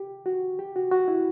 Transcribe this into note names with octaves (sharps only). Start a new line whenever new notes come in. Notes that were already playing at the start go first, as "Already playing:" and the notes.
Already playing: G4
F#4
G4
F#4
F#4
E4